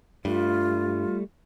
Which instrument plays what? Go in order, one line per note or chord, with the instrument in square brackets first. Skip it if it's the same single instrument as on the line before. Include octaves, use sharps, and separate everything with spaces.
[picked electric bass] G2 [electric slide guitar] G3 A3 [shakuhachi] F4